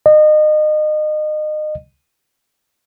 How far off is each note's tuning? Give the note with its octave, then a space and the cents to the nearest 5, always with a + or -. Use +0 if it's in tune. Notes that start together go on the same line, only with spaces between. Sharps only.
D#5 -30